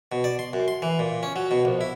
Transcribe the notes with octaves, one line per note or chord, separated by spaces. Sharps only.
B2
D5
C6
F#2
C6
E3
A#2
C#4
F#3
B2
A#1
E4